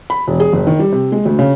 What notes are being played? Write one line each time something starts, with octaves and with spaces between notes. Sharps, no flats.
B5
E1
G#4
F#1
D#3
G3
C3
G#3
D2
C#3